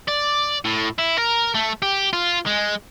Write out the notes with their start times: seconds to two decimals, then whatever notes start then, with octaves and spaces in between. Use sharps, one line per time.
0.08 D5
0.65 A2
0.98 E4
1.18 A#4
1.55 A3
1.82 G4
2.13 F4
2.47 G#3